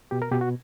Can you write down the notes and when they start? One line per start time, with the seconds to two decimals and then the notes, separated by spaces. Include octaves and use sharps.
0.11 B2 G4
0.22 A#4
0.32 B2 G4
0.41 F#4